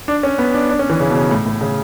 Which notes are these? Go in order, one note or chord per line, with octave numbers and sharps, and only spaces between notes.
D4
C#4
B3
D4
D4
C#4
E3
C#3
B2
C#3
A2
A2
C#3